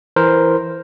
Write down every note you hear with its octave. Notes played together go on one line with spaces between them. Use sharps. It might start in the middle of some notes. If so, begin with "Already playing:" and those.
E3 A#4 C5